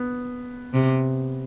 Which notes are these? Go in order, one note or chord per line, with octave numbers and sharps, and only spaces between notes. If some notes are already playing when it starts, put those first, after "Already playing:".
Already playing: B3
C3